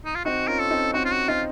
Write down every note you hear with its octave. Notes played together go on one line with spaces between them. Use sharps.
D#4
F4
C4 D#4 F#4
C#4 F4 A#4
A4
C4 D#4
C4 D#4 F#4
F4
F#4
C4 D#4 F4